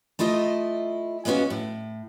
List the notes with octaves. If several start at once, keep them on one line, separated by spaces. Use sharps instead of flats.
A3 E4 F4 D#5
G#3 A#3 B3 C#4 F#4
A2